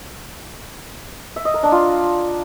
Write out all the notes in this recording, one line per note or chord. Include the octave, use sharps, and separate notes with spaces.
E5
D#5
A#4
D4
F4